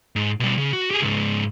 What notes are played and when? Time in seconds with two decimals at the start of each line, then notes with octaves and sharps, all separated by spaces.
0.16 G#2
0.40 B2 G3
0.58 C#3
0.73 F#4
0.91 G4 G#4
1.02 C#2 G#2